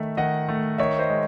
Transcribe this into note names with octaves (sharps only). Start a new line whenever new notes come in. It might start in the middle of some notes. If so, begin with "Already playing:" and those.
Already playing: D#3 A3 E5
D#3 D#5 F#5
A3
D#3 C#5 E5
C5 D#5
G#3